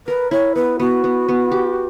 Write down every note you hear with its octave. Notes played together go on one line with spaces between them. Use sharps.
A#4 B4
E4 C#5
B3 B4
B3 F#4
B3
B3
G4